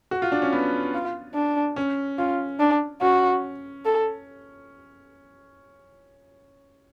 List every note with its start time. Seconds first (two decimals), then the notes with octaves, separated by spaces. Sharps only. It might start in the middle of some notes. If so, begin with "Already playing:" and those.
0.11 F#4
0.22 F4
0.32 D4
0.42 C#4
0.53 B3
0.94 F4
1.35 D4
1.76 C#4
2.18 C#4 F4
2.60 D4
3.01 C#4 F#4
3.85 A4